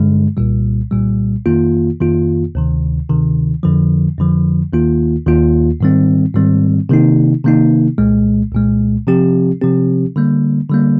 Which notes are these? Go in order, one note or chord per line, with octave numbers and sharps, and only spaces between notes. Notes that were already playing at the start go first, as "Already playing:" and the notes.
Already playing: G2 D3 G#3
C2 A#2 G3
C2 A#2 G3
F2 D#3 A#3 F4
F2 D#3 A#3 F4
D2 C3 D#3
D2 C3 D#3
F2 D3 F3
F2 D3 F3
D#2 D#3 A#3 F4
D#2 D#3 A#3 F4
G#2 D#3 G3 C4
G#2 D#3 G3 C4
C3 D#3 A#3 D#4
C3 D#3 A#3 D#4
C2 A#2 G#3
C2 A#2 G#3
C3 F3 C4 G4
C3 F3 C4 G4
D3 G3 A#3
D3 G3 A#3